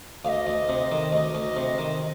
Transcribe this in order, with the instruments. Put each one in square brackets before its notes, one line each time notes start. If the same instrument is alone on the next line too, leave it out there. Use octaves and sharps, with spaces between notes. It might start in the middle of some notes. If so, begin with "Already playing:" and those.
[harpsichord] D2 [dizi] D#5 F5
[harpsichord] D2
C3
D#3
[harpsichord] D2 [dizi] D#5
[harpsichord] D2
C3
D#3